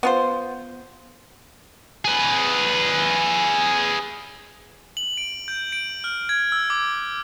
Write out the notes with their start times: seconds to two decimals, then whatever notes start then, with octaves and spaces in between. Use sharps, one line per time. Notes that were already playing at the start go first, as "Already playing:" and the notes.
0.03 B3 F4 C5
2.05 G#4 B4
4.97 F#7
5.17 D7
5.48 G6
5.72 D7
6.04 F6
6.29 G#6
6.52 E6
6.70 D6